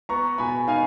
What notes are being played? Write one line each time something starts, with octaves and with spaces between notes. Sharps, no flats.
B3 A#5 C#6
B2 G#5 B5
D#4 F5 G#5